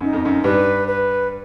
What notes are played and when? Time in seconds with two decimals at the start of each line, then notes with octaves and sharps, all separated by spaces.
0.01 F#2 D#4
0.13 F2
0.25 F#2
0.44 G2 B4
0.87 B4